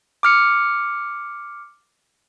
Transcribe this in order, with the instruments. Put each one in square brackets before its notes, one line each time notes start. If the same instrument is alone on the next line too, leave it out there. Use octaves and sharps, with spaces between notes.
[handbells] D6 F6 C#7